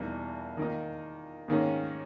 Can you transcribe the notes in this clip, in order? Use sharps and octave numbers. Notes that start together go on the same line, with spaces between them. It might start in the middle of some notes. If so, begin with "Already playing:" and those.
Already playing: E2 B2 G3 A#3 D#4
D#3 A#3 D#4
G#2 D#3 A#3 C#4 G#4